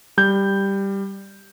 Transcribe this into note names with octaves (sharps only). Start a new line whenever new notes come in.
G3 G6